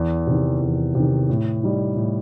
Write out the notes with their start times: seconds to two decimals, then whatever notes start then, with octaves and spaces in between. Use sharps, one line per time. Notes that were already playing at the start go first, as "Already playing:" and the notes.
Already playing: E2
0.27 C3 D#3
0.61 E2
0.95 C3 D#3
1.29 A2
1.63 G3 D#4
1.96 A2